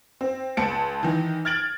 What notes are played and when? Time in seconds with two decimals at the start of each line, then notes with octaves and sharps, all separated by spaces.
0.21 C4
0.57 C#2 A5 C#7 D7
1.03 D#3 E3
1.45 F6 G#6 A6 D7 F#7